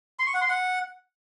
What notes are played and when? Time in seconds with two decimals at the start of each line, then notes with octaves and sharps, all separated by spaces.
0.19 C6
0.27 C#6
0.34 F#5
0.41 C6
0.49 F#5